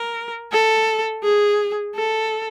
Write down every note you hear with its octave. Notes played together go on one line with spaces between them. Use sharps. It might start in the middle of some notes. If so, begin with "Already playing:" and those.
Already playing: A#4
A4
G#4
A4